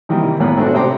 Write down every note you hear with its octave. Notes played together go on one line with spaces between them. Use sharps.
C3 D#3 E3 G3 A#3
G#1 A2 A#3 B3 F#6
A3 C4 D4 F#4 A4
C3 C5 G5 A#5 C6 D6